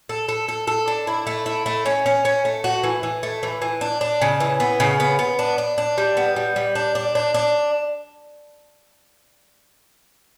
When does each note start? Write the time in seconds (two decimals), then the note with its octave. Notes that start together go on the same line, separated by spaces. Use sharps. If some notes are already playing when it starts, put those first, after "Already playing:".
0.09 A4
0.28 A4
0.48 A4
0.67 A4
0.88 D4
1.07 E4
1.27 A3
1.46 E4
1.66 A3
1.86 C#4
2.06 C#4
2.25 C#4
2.45 A3
2.64 F#4
2.83 E3
3.03 E3
3.23 A3
3.43 E3
3.62 E3
3.81 D4
4.01 D4
4.21 C#3
4.40 E3
4.60 B3
4.80 C#3
5.00 B3
5.19 B3
5.39 D4
5.58 D4
5.78 D4
5.98 G3
6.17 B3
6.36 G3
6.56 G3
6.75 D4
6.95 D4
7.15 D4
7.34 D4